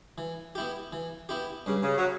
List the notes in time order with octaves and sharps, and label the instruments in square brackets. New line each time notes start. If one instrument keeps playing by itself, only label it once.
[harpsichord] E3
B3 E4 G4
E3
B3 E4 G4
[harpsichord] G2 [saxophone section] C#3
[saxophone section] C#3
F#3